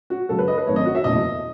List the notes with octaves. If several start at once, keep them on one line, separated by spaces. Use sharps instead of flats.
F#4
F#2 C#3 G#3 A4
B4
D#5
B4
G#1 F#2 D#3 A3 C#5
D#5
F#4
E5
F#1 E2 B2 A3 D#5